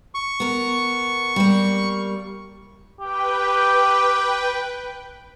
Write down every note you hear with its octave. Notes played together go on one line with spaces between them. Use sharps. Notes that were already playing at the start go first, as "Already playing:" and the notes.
C#6
B3 A#4
G3 A#3
G4 B4 G5